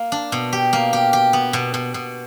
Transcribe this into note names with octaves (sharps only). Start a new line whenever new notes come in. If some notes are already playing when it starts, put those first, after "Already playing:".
Already playing: A#3
D4
B2
G4
A#3
G4
G4
B3
B2
B2
B2